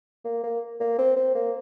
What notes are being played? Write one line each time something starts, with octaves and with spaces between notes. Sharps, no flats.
A#3
A#3
A#3
C4
C4
A#3